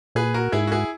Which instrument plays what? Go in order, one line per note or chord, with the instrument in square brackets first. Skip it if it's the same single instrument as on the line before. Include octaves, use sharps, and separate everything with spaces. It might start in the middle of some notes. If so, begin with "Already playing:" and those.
[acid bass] A#2 [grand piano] G#4 B4
[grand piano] F#4 A#4
[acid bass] G#2 [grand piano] E4 G#4
[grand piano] F#4
E4 G#4